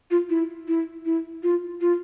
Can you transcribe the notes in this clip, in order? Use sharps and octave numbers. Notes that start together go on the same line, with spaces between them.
F4
E4
E4
E4
F4
F4